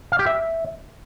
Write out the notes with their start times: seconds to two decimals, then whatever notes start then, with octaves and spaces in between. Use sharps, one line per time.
0.12 F5
0.19 G4
0.26 E5